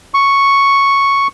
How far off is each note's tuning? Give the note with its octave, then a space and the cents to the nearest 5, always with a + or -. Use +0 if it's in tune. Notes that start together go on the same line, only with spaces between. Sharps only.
C#6 +0